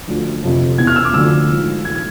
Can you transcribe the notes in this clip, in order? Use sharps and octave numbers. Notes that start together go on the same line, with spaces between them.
D2 D3 F3
F2 C3 F3
E2 B2 G#6
F6
E6
D6
D2 D3 F3 E6
G#2 F3
G#2 E3 G#6
G#6